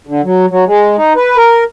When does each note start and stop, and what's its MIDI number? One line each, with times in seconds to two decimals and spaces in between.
0.07 0.22 50
0.24 0.46 54
0.50 0.64 54
0.67 0.96 56
0.97 1.13 63
1.16 1.37 71
1.37 1.64 70